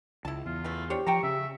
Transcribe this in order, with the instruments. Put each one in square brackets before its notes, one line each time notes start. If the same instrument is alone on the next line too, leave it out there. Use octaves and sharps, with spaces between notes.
[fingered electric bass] C#2 [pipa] E4 A5
[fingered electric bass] E2 [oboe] F4
[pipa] E3 F#3 A3
[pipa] D4 C5 C#5 [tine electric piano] G4
[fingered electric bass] F3 [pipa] G5 A5 A#5 [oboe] C#6
[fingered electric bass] C#3 [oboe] E5